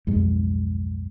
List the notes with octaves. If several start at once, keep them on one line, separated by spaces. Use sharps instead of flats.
B1 F2 G#2 G#3